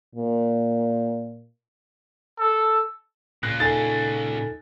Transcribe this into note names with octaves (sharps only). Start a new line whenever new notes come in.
A#2
A4
A#2 C#3 F4 F#6 A#6
D#4 A4 G#5 A6